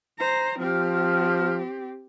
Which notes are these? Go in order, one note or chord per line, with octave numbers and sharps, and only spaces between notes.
C5 A#5
F3 C4 G4 F6